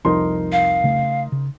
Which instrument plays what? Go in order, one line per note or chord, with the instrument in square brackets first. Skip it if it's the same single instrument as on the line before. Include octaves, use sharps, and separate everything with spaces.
[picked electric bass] C2 F2 F3 [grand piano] D#4 A#4 C6
[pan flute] F5
[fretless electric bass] C#3 A3
C#3